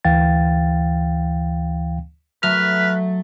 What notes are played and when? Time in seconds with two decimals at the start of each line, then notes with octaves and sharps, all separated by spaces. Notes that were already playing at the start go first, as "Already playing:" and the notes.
0.04 D2 E3 F5 G5 A6
2.43 F#3 A3 B4 F6